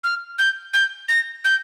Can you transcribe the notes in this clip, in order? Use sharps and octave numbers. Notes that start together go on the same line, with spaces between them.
F6
G6
G6
A#6
G6